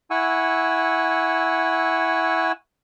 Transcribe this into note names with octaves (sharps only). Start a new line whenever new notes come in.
E4 F#5 G#5 C#6 E6